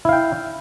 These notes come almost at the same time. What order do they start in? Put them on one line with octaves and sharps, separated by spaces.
E4 F5 G5